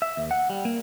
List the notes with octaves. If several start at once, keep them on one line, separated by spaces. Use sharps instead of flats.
E5
D#2
F#5
G3
A#3